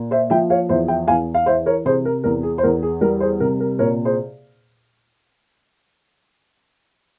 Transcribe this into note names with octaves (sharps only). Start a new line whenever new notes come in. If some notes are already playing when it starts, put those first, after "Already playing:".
Already playing: A#2 A#3
C5 E5
F3 E5 G5
C#5 F5
E2 C5 E5
E5 G5
E2 F5 G#5
F5
E3 C5 E5
A#4 C#5
C3 G#4 C5
A#4
E2 A#4
G#4
C5
E2 A#4
G#4
G3 A#4
G#4 C5
C3 A#4
A#4
A#2 A#4 C#5
G#4 C5